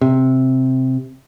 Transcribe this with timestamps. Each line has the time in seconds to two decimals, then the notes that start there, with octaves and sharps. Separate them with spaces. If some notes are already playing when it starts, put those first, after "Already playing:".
0.01 C3